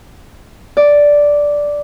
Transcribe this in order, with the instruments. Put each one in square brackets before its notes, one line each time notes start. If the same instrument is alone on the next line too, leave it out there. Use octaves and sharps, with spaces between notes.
[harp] D5